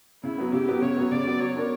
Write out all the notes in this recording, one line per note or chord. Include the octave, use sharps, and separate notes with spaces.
C#3 E4
F#3 B3
C#3 G4
F#3 B3
C#3 C#5
F#3 B3
C#3 D5
F#3 B3
F#3 C#5
B3 D4 A#4